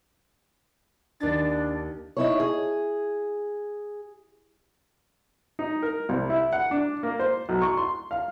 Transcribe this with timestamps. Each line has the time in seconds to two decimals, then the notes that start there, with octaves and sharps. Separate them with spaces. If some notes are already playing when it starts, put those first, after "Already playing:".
1.20 D#2 D4 A6
2.17 D#4 E4 C#5
2.40 G#4
5.59 D#4
5.82 A#4
6.09 C2
6.30 E4
6.53 F#5
6.71 D4
7.03 A#3
7.20 C5
7.49 B1
7.62 C#6
7.77 C6
8.11 F5